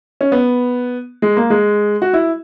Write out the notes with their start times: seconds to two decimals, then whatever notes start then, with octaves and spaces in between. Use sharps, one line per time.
0.21 C#4
0.32 B3
1.22 G#3
1.37 A#3
1.50 G#3
2.02 F#4
2.13 E4